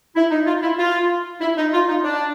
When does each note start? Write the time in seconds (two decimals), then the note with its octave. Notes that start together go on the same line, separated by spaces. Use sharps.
0.16 E4
0.31 D#4
0.47 F4
0.62 E4
0.78 F4
1.41 E4
1.57 D#4
1.73 F4
1.88 D#4
2.04 D4